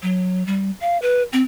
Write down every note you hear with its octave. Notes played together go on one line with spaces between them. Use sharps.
F#3
G3
F5
B4
C4